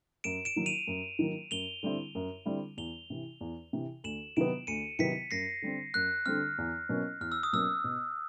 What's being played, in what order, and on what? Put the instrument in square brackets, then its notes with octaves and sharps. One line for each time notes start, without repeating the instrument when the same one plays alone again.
[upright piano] F#2 [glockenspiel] D7 E7
[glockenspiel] D7 E7
[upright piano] D#3 F#3 A#3
[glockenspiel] D#7 F7
[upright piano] F#2
D#3 F#3 A#3
[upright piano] F#2 [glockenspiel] F7 G7
[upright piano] D3 G3 C4 E4
F#2
D3 G3 C4 E4
[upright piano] E2 [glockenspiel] F7 G7
[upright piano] C3 E3
E2
C3 E3
[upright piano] D2 [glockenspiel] E7 F#7
[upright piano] C3 D#3 F#3 B3 [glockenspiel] D7 E7
[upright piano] D2 [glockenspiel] C#7 D#7
[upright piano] C3 D#3 F#3 B3 [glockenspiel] B6 C#7
[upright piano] F#2 [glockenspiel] A#6 C7
[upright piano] D3 G3 C4
[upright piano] F#2 [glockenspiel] F#6
[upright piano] D3 G3 C4 [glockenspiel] F6
[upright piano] E2
B2 F#3 A#3 C#4
[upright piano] E2 [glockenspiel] F6
[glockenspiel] E6
D#6
[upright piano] B2 F#3 A#3 C#4 [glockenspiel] E6
[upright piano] B2